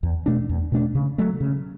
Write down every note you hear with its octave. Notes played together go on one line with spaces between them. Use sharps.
E2
B2 A3 D4
E2
B2 A3 D4
C#3
F#3 A3
C#3